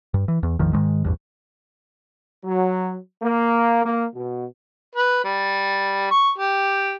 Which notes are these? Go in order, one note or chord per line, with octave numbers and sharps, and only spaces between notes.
G2
E3
E2
A1 E2 D#3 F3
G#2 D#3 G#3
A1 E2 G2
F#3
A#3
A#3
B2
B4
G3
C#6
G4